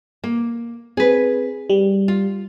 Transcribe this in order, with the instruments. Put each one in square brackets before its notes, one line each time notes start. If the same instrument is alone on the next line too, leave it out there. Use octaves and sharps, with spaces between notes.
[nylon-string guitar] A#3
[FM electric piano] C4 [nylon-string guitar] G#4 B4
[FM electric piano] G3
[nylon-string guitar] F4